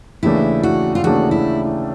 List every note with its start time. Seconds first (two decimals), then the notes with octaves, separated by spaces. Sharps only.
0.23 D#2 C#3 E3 A3 D4 E4
0.63 F#4
0.95 F4
1.04 D#2 C#3 E3 A3 D4 F#4
1.31 E4